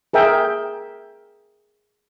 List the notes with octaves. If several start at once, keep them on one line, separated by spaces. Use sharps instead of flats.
G#4 A#4 E5 G5